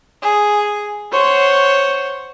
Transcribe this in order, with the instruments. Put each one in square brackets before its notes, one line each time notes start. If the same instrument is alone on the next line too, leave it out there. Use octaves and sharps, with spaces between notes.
[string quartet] G#4
C5 C#5 F#5